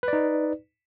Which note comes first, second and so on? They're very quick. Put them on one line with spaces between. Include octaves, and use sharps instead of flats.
B4 D5 D#4